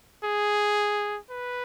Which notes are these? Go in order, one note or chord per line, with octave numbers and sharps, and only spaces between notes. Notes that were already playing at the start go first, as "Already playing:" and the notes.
G#4
B4